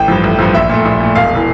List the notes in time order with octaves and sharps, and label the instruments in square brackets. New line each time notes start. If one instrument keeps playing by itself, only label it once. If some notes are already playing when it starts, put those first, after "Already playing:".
Already playing: [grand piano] A1 G5
G2 F3
A1
G2 F3
A#1 E5
A#2 A3
A#1
A#2 A3
E1 F5
E3